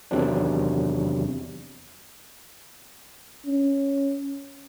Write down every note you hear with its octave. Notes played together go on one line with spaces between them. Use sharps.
E2 C3 D#3 F#3 C4 D4
C#4